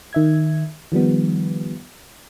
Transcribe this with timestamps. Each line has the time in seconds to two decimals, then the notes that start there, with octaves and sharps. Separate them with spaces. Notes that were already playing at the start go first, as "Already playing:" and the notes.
0.13 D#3 E5 G#6
0.92 D#3 F3 G3 B3